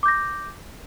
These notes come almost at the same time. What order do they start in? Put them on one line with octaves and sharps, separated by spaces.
D6 G6 A#6